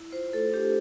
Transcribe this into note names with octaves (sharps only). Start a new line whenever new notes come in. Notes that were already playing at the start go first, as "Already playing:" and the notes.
Already playing: E4
F4 C5
A3 A4
D4 G4